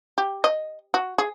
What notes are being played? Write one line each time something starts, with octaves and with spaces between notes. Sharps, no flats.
G4
D#5
F#4
G#4